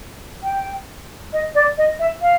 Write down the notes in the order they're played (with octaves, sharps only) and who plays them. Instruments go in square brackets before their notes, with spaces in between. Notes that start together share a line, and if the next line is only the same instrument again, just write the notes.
[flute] G5
D#5
D5
D#5
E5
F5